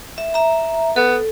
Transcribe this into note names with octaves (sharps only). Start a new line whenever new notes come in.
E5
E5 A#5
B3 A4